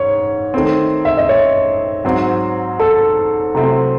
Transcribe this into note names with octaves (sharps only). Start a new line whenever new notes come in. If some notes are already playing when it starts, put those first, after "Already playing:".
Already playing: G#2 C#5
D#3 A3 C4
E5
D#5
C#5
G#2 F#3 C4
A4
C3 F#3 A3 C4 E4